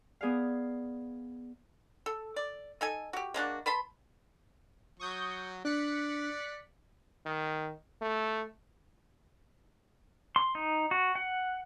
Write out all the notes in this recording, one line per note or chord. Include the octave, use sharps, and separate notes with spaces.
B3 G#4 D5 F5
A4
D5
D#4 A4 G#5
F#4 G4
G#3 A#3 D4 F#4
B4 A5 B5 C6
F#3 C#6 D#6 G6
D4 D5 F#6 B6 C#7
D#3
A3
C6
D#4
F#4
F#5